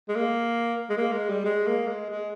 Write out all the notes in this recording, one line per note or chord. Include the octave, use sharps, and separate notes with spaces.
G#3
A#3
G#3
A#3
G#3
G3
G#3
A#3
G#3
G#3